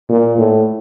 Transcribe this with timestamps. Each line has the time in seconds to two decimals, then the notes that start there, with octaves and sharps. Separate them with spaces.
0.09 A#2
0.38 A2